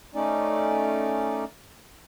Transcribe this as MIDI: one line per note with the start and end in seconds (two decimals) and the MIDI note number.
0.15 1.44 57
0.15 1.44 61
0.15 1.44 63
0.15 1.44 74